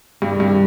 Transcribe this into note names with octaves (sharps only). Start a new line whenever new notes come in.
C2 G2 C3 D#3 G3
G2